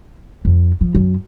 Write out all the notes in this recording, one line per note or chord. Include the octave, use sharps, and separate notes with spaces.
F2
F3
F#2